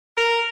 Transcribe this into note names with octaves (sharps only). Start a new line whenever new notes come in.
A#4